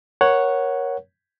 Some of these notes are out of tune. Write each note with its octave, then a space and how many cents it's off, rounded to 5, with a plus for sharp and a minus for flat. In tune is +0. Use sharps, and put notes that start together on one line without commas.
A#4 +20 C#5 +0 F#5 +0